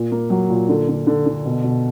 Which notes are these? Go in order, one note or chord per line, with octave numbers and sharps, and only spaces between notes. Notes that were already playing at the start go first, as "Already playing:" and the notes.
Already playing: A#2
A#3
F#3
A#2
D3
D3
D3
D3
B2
B2